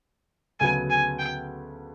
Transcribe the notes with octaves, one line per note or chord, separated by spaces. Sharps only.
D2 C#3 F#3 B3 G#5
G#5
G5